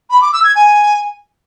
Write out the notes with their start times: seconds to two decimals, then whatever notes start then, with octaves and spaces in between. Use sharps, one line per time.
0.10 B5
0.21 D6
0.33 E6
0.44 G#6
0.55 G#5